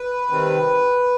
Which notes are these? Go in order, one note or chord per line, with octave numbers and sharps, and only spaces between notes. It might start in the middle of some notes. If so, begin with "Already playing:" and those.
Already playing: B4
C3 D#3 G3 C4